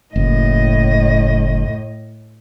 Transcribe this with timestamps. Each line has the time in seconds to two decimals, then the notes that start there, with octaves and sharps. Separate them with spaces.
0.16 F#1 A2 D#5